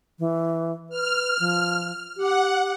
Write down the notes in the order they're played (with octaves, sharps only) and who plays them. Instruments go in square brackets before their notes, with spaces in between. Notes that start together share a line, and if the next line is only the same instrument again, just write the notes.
[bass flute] E3
[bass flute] B4 [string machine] F6
[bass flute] F3
[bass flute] G4 [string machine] F#5